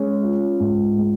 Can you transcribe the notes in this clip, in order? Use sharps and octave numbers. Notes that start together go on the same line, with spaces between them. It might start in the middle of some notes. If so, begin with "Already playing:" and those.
Already playing: G#3 C#4
F4
G#2
G#3